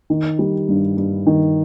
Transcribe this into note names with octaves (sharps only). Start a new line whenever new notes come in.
D#3
G3
G2
G2
D#3